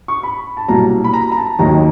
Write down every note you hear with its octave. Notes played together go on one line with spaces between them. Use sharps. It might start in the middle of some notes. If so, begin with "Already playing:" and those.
C#6
B5
A5
C2 B2 F#3 A#3 A#5
B5
A#5
A#5
A5
D#2 D#3 F#3 A#3 A#5